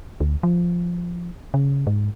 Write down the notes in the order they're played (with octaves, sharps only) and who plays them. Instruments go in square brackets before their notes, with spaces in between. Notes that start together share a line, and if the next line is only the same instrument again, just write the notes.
[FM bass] D2
F3
C#3
G#2